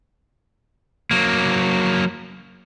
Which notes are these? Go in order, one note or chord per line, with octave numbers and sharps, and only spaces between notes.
F#3 A#3